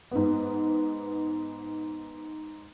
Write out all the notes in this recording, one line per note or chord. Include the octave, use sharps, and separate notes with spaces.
G#2 B3